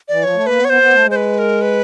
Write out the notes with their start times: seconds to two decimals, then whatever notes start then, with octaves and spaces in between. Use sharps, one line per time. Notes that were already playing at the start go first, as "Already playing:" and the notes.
0.08 E3 D5
0.23 F3 C#5
0.36 A3
0.46 A#3 B4
0.57 B3
0.65 C#5
0.70 B3 C5
0.82 B3
0.93 A3
1.04 G#3
1.11 C5
1.16 B4
1.39 A#4
1.62 B4